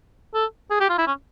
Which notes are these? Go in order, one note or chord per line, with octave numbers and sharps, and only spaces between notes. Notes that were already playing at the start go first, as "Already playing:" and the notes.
A4
G#4
G4
F4
E4
C#4